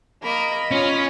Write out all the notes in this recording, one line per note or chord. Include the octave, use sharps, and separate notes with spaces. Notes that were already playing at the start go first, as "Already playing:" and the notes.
A#3 A#4 D#5 B5
C#4 F4